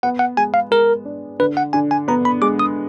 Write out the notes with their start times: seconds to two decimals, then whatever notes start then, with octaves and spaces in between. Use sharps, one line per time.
0.03 B3 F#5
0.19 F#5
0.37 G#3 G#5
0.54 F5
0.71 G#3 A#4
1.05 D4
1.39 D3 B4
1.57 F#5
1.73 D3 G#5
1.91 G#5
2.08 B3 A#5
2.25 B5
2.42 G#3 D6
2.59 D#6